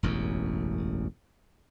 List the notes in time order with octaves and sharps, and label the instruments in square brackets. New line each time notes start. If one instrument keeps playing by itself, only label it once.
[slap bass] E1 A1 F#2